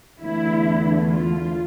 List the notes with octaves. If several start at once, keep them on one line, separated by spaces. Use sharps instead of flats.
E2 D3 A3 E4
F4